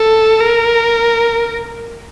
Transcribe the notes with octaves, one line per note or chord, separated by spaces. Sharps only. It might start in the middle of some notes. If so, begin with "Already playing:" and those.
Already playing: A4
A#4